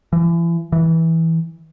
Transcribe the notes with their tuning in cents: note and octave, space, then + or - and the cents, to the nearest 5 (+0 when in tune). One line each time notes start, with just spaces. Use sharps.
E3 +35
E3 -15